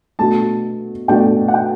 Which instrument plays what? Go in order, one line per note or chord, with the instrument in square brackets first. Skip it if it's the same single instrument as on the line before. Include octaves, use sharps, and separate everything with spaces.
[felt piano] B2 A3 D4 F#4 [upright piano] A5
[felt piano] B2 A3 D4 F#4 [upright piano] G5
[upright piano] F#5
G5